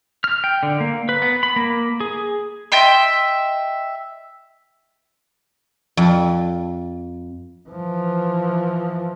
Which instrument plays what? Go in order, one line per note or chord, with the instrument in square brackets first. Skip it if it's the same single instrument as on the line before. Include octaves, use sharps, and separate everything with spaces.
[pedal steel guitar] F6
G5
D3
A#3
B4
B3
B5
A#3
G#4
[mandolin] D#5 E5 G5 C6
[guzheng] F2
[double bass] E3 F3